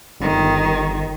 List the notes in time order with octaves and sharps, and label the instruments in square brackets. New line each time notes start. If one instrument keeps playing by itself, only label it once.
[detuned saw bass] G1 [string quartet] D#3